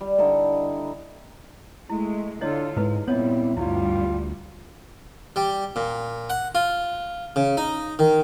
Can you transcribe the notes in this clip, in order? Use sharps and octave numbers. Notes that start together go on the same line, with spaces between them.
G3
D3 D#4 E4 A4
G#3 A3 E4
D3 D4 E4 F4 A4 C#5 D#5
G#2 G#3 D#4 E4 B4
A#2 G3 B3 C4 E4 C#5 D#5
D2 G2 G3 E4 F4
G3
A#2
F#5
F4
C#3
D#4
D#3